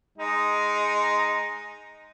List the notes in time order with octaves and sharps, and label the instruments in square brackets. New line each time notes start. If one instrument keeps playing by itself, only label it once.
[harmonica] G#3 D#4